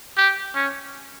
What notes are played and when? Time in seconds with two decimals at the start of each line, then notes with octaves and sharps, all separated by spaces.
0.17 G4
0.55 C#4